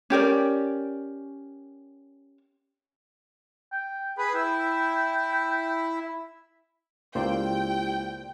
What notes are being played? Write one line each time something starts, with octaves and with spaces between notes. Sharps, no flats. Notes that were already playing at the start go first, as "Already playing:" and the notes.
C#4 G4 A#4 D5
G5
G#4 B4 B5
E4 E5 G5
C#2 A#3 E4 G4 C5 D5 G5